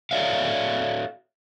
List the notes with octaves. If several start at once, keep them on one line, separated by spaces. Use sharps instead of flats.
F#4 A4 C#5 D5 E5 F5